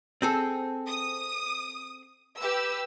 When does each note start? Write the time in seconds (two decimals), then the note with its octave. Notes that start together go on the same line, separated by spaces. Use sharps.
0.22 C4 G#4 A4
0.87 D#6
2.39 G4 B4 E6